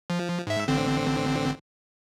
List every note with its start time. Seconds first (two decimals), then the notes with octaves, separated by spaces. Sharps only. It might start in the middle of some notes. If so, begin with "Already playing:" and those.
0.10 F3
0.47 G#2 E5
0.68 A1 D3 C4